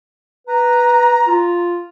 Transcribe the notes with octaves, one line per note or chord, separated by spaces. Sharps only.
B4 A#5
F4